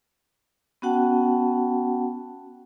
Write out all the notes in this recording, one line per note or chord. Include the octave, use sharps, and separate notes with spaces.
B3 C#4 F#4 F#5 G5 A5